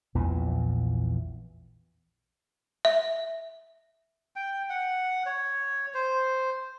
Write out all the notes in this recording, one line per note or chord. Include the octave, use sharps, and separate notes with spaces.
A#1 E2 A#2 E3
E5
G5
F#5
C#5
C5